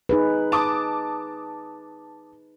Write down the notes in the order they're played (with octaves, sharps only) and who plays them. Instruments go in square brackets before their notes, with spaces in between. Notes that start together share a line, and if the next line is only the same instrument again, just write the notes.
[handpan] D#4 G#4 B4
[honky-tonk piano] A5 D6 D#6